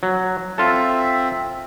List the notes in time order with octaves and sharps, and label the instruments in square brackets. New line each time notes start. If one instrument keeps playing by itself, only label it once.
[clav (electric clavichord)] F#3
[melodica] C4 E5 [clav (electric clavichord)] F4 A4